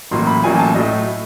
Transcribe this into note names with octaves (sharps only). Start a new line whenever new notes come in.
A1 A2 F#3 A#3 C6
B5
A1 A2 F#3 A#3 G#5
A5
A2 F#3 A3 D#5